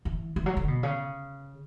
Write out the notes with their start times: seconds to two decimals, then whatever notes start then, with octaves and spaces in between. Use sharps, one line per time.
0.05 E3
0.36 E3
0.46 F#3
0.57 D3
0.68 B2
0.83 C#3